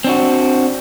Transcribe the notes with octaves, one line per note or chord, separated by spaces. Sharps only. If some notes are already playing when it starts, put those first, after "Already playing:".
C4 D4 F#4